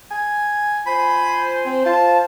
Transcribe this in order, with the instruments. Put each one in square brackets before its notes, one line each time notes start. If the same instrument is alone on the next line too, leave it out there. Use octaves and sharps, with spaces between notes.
[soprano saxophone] G#5
[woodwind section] F4 C5 G#5 [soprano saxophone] B5
[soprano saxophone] C4
[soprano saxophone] F4 [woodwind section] C5 A5